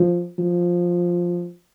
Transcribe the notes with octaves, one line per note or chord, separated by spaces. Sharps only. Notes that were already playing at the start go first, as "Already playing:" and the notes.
Already playing: F3
F3